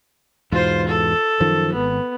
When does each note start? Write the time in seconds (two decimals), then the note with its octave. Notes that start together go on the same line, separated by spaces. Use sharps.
0.52 E2 G#2 B2 F4 C5
0.88 A4
1.40 F#2 D#3 F3
1.72 G#1 B3